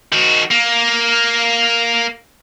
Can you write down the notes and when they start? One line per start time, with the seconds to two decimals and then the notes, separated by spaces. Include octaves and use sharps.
0.13 D#3 F#4
0.51 A#3